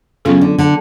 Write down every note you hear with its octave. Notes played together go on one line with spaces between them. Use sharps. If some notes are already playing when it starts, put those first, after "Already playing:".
C#3 F#3 B3 F4 A4
D3
D3